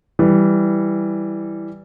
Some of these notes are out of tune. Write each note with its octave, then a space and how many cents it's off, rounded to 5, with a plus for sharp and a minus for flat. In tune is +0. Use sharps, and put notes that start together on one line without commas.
E3 +0 G3 +0